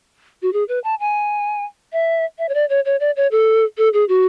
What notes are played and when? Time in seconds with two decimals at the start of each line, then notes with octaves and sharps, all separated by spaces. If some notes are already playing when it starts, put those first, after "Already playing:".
0.42 F#4
0.53 G#4
0.68 B4
0.84 A5
1.00 G#5
1.93 E5
2.38 E5
2.49 C#5
2.54 D5
2.69 C#5
2.85 C#5
3.00 D5
3.16 C#5
3.31 A4
3.78 A4
3.93 G#4
4.09 F#4